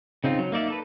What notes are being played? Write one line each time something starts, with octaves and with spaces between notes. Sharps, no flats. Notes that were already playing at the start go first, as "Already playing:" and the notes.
C#3 C4 D#4 F4
F#3
A#3 D#4 D5 E5
D#4 A4 B4